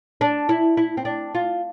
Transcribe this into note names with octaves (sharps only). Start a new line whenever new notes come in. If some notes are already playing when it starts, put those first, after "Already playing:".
D4
E4
E4
C4
D4
F4